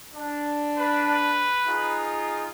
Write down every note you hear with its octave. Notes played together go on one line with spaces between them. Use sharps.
D4
B4
D#4 F4 G#4